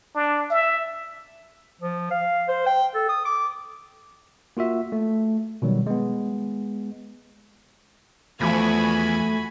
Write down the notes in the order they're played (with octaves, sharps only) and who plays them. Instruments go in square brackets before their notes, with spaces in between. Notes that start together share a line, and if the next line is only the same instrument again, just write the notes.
[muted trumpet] D4
E5
[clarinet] F3
F5
C5
G5
A4
D#6
D6
[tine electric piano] A#3 F4 F#4 E5
A3
B2 D#3 F#3 G3
G#3 B3
[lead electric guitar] E2 [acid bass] F3 [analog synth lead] A3 [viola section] F#4 G#5 B5